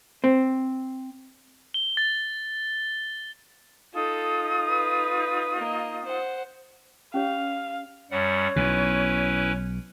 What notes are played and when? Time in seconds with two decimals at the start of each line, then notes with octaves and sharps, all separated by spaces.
0.24 C4
1.74 G7
1.97 A6
3.94 D#4 F4 A4 D#6
4.69 B4
5.56 A#3 D#5
6.05 C5 F#5
7.14 C#4 G4 C#5 F5
8.11 F#2 G3 C#5 F#5
8.56 B1 B2 C#4 E4 B4